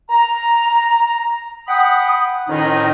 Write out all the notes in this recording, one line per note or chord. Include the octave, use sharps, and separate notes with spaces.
A#5
F#5 G5 B5 D#6
F2 A2 D#3 C#4 D#4